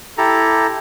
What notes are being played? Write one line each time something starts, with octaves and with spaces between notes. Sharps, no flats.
E4 G4 A4 A#5